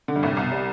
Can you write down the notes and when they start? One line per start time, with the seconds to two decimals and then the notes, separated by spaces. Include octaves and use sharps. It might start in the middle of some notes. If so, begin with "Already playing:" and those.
0.08 D3
0.16 G2
0.23 C2 A2
0.33 G2
0.37 C2
0.42 B2
0.52 G3